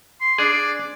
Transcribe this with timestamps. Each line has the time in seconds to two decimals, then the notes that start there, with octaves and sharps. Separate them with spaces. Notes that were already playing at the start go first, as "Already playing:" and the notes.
0.21 C6
0.38 D4 G#4 D5